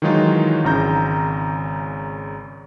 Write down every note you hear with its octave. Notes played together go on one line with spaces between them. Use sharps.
D#3 E3 F#3 G#3 D#4 F4
G#1 C#3 A#5 G6